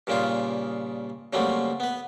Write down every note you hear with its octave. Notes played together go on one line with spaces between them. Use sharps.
G2 A#2 C#3 A#3 D#4 F4
C#3 F#3 G3 A3 A#3 C4
B3 B4